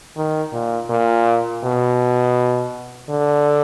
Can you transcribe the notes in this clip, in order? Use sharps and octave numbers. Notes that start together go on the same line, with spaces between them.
D#3
A#2
A#2
B2
D3